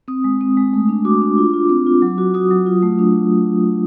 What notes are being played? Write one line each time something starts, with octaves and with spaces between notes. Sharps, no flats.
C4 D#6
G#3
C4
G#3
A3
D4
F#4 D6
D4
F4
F4
C4
F4
F#3
F#4
F#4 D#6
F#3
F4
A3
D4